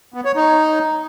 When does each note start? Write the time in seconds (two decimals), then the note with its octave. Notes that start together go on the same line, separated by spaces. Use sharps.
0.14 B3
0.25 C#5
0.36 D#4